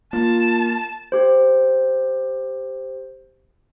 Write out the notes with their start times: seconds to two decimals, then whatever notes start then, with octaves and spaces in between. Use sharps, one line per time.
0.13 A#3 F4 A5
1.12 G4 C5